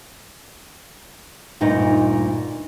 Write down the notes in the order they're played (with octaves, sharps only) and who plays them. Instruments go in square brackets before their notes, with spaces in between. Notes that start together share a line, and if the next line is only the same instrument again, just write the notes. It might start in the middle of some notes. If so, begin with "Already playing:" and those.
[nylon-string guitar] D2 G2 A#2 D#4